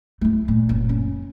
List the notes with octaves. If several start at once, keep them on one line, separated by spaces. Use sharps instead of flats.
A3 E4
A#2
F#1
C#4